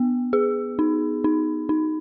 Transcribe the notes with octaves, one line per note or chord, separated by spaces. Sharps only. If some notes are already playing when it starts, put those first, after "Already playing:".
Already playing: B3
G#4
D#4
D#4
D#4